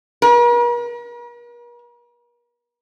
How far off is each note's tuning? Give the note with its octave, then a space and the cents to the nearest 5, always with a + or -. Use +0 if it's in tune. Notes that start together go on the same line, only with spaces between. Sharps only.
A#4 +45